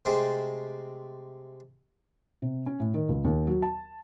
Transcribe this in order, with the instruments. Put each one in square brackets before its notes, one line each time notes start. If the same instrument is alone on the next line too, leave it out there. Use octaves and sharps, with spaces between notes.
[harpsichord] C3 G#3 A3 C4
[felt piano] C3
C#4
A2
D#3
C#2
D#2
F#3
A5